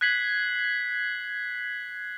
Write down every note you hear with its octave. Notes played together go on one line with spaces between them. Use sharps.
F#6 G#6 B6 C7 F#7